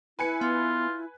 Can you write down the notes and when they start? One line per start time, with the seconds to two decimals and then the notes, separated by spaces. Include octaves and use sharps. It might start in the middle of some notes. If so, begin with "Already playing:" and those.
0.19 E4 B4 G#5 C#7
0.41 B3 F4